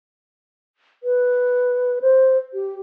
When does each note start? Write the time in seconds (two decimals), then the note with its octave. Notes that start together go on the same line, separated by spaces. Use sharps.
1.03 B4
2.01 C5
2.54 G4